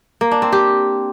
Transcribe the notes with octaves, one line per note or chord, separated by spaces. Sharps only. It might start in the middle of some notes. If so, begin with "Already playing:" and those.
A#3
D4
C4
G4